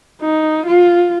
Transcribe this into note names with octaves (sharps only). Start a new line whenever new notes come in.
D#4
F4